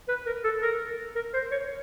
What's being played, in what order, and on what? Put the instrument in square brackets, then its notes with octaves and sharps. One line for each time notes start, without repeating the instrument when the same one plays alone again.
[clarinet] B4
A#4
A4
A#4
A#4
C5
C#5